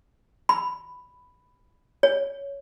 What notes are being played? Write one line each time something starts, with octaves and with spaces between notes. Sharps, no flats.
B5
C#5